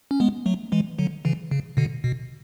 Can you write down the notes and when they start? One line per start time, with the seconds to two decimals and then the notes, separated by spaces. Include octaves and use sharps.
0.11 C#4
0.20 G#3 B3
0.46 F#3 A3
0.72 E3 G#3
0.99 D3 F#3
1.25 C#3 E3
1.51 C#3
1.77 B2 D3
2.04 B2